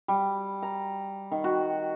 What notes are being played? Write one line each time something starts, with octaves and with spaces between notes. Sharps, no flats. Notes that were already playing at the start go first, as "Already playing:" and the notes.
G3
A#5
D#3
F#4